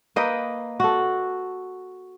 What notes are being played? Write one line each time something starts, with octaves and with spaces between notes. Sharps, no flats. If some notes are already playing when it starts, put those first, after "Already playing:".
A#3 B4 D#5 G5
F#4 A4